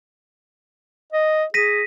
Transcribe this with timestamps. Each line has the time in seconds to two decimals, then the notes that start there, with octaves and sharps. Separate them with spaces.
1.12 D#5
1.54 G#4 A#6 B6 D#7